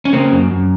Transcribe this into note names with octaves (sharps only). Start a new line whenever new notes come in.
C#4
C#3 A#3 C4
F#2
F#2